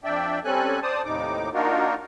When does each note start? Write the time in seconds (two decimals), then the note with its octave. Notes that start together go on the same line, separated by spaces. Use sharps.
0.04 F2 D4 D5 E5 G5
0.44 G3 C4 C#4 A4 G#5 F#6
0.83 C5 D5 A5 D#6
1.05 D#2 A2 C3 D#4 D6
1.54 A#3 D4 D#4 F4 F#4 A#4